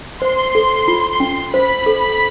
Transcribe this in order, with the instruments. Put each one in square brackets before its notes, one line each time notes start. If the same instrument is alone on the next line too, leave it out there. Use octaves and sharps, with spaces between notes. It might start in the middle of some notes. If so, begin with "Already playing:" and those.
[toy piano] C5 [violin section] C6
[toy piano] A4
F4
C#4
[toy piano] C5 [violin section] B5
[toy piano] A4